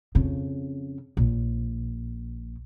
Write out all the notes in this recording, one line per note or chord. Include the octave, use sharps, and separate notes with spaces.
F2 C#3
A#1